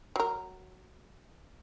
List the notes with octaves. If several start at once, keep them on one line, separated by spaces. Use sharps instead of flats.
F#3 A#4